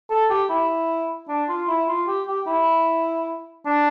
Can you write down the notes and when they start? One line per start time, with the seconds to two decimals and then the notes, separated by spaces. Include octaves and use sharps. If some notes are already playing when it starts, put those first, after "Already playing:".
0.10 A4
0.30 G4
0.50 E4
1.28 D4
1.49 F4
1.68 E4
1.88 F4
2.07 G4
2.27 G4
2.47 E4
3.66 D4